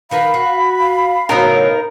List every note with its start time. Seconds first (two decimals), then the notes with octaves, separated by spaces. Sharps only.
0.11 D#3 A#4 B4 F5 B5
0.34 F#4
0.80 F5
1.29 A2 C#3 F#3 B3 D#4 A#4